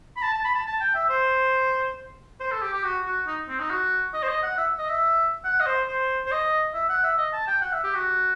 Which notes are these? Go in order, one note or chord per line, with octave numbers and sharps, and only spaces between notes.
B5
A5
A5
B5
A5
A5
G5
E5
C5
C5
A4
G4
G4
F#4
F#4
D#4
C4
D#4
F#4
D#5
C5
D#5
F#5
E5
D#5
E5
F#5
D#5
C5
C5
C5
D#5
E5
F#5
E5
D#5
A5
G5
F#5
E5
G4
F#4